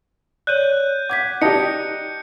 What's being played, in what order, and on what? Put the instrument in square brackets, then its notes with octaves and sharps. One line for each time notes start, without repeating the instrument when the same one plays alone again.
[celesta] C#5 D5 [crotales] F#6 G6 D#7
[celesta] F#5 G#6 B6 [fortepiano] D6
[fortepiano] D#4 G4 [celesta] D5 A5 [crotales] C#7